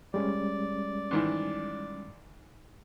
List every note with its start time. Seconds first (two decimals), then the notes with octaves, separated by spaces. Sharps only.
0.14 G3 G#3 C#4 D5
1.11 G#2 D#3 E3